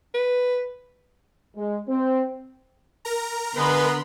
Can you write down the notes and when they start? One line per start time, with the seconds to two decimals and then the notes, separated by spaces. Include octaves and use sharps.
0.14 B4
1.56 G#3
1.89 C4
3.05 A#4 A#5
3.56 D3 G#3 B3 B4 B5 C6